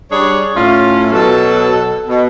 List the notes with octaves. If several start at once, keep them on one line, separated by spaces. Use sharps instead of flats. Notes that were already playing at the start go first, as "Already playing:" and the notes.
G3 D4 G#4 C#5
A2 C#4 F4
B2 F#3 A4
B2